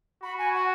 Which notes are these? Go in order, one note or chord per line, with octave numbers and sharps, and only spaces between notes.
F#4 B5
G#5
F#5